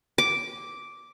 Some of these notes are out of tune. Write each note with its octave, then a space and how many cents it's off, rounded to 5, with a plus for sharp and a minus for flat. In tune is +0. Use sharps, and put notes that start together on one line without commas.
D6 -5